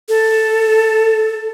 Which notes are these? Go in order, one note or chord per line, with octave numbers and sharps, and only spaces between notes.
A4